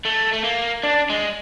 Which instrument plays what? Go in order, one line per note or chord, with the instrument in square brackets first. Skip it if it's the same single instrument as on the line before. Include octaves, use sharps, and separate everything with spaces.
[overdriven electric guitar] A3
A3
A#3
D4
G#3